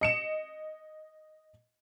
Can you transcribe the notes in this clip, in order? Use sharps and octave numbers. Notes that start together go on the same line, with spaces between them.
D#5 C#7 E7